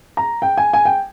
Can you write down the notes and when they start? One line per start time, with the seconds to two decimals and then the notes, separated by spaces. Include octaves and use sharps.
0.17 A#5
0.42 G5
0.57 G#5
0.73 G#5
0.85 G5